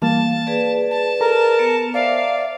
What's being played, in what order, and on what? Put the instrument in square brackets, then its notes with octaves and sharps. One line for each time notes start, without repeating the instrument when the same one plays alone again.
[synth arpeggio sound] E3 G3 A#3 [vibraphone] F5 [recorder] A5
[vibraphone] G#4 B4 D5
[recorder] A5
[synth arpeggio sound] A4 A#5 [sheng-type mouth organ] A#4
[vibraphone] B3 [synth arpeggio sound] C#7
[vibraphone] C5 E5 [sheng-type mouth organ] D5 [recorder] F5